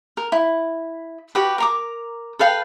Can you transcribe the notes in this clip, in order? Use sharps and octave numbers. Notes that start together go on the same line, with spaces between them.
A#4
E4
F#4 G4 B4
A#4 A#5 D6
A4 B4 F5 G5